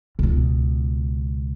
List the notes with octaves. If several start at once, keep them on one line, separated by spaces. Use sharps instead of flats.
C#2 B2